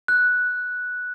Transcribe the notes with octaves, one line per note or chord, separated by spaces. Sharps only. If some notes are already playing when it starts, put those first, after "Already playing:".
F#6